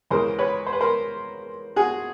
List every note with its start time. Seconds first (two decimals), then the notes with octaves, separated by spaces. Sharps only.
0.11 E2 C#3 E3 G#3 A#4 C5
0.39 B4 C#5
0.66 C5
0.73 B4
0.81 A#4 C5
1.76 F#4 G#4